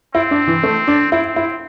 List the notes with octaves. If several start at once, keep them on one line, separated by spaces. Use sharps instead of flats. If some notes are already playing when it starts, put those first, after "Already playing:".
C4 E4
D4
E3
A3
D4
C4 E4
E4